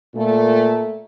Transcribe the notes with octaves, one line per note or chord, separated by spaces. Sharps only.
A#2 A3